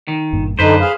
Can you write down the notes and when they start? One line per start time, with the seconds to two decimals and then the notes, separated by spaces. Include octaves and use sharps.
0.08 D#3
0.33 G1 G2 A#2
0.59 F#2 D3 D#4 B4 C5
0.81 G#4 F5